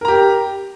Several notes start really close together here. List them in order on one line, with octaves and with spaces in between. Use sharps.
A#4 A#5 G4